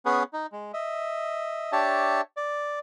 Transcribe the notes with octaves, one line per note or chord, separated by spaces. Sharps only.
B3 C#4 G#4 B4
D#4
G#3
D#5 E5
D4 G4 C#5 E5 A5
D5